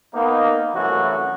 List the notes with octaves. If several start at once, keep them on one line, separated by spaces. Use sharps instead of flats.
A#3 B3 D#4
C2 F#2 E3 A3 E4 F#4